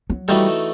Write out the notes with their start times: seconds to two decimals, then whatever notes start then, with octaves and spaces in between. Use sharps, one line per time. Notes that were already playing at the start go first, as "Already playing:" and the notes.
0.10 F#3
0.28 E3 G3 A3 D#4 F#4 A4